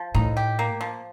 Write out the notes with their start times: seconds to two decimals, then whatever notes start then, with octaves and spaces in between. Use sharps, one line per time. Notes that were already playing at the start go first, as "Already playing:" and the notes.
Already playing: F3
0.15 A2 D#4
0.37 G4
0.59 A#3
0.81 F3